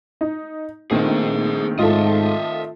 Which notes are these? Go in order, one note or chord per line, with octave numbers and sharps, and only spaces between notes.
D#4
A#1 D#3 A3 C4 G#4 C5
G#2 F4 A4 D#5 E5